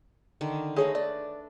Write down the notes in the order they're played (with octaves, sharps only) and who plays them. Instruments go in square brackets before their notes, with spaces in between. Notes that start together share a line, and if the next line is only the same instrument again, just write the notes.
[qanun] D3 D#3
[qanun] A3 B4 D#5 [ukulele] D#4 G#4 C#5
[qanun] D4 [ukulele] D5